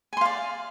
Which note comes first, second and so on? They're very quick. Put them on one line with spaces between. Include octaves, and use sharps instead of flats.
G#5 C6 F5 D5